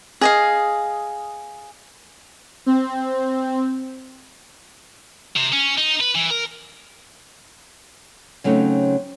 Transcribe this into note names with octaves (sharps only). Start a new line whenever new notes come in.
G#4 D#5 F5
C4
C3
C#4
D#4
B4
E3
A#4
C#3 F#3 A3 C4 C#4 D#4